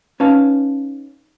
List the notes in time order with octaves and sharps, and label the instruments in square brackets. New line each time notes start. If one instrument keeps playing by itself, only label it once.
[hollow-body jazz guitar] C#4 D#4 B4 F5 A5